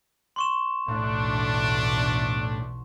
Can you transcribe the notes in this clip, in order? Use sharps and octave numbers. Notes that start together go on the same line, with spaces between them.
C6 C#6 E7
B1 E2 A2 A3 D4